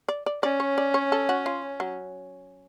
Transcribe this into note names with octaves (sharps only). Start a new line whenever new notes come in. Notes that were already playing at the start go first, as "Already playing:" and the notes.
D5
D5
C#4 D5
C#5
D5
C#5
A4
F#4
F4
F#3